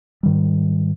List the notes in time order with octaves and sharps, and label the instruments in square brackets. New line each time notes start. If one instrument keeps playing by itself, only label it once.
[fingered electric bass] G#2 D#3 G3